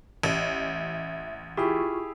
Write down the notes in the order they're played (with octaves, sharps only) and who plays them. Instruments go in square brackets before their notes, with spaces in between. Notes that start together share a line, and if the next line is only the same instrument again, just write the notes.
[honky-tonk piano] A1 [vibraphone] E5
[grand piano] E4 G4 G#4 [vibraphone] F4 C#6